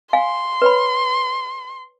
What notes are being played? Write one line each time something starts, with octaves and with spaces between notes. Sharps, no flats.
F5 G#5 C6
B4 C#5 B5